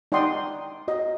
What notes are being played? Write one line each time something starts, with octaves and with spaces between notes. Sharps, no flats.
D#4 D5 F#5 G5 C6 D#6
F#4 D#5